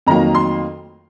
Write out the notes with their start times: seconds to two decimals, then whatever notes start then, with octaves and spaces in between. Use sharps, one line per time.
0.07 F2 D#3 F#3 A#3 A#5
0.35 C6